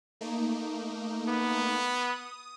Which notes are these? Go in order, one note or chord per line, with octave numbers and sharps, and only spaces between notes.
A3 A#3 D#4
B3
D#6